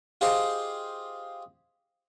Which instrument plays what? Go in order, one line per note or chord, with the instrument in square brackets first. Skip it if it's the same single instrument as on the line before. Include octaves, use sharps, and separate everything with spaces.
[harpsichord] F4 G4 G#4 C5 D#5 F5